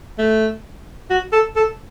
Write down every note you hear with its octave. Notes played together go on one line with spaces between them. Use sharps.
A3
F#4
A4
A4